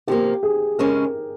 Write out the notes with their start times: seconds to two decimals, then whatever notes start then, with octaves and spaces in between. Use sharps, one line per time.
0.07 C3 F3 A#3 G4
0.43 G#4
0.79 C#3 G#3 C#4 A#4